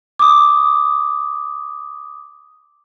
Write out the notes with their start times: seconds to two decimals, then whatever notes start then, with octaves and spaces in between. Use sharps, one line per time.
0.19 D6 D#6